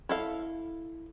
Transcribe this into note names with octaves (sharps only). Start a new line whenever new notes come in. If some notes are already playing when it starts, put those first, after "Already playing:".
E4 A4 F5